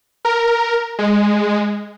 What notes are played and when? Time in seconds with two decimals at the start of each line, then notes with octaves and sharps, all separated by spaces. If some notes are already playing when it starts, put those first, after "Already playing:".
0.25 A#4
0.99 G#3